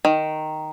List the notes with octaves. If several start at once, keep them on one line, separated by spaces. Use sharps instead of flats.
D#3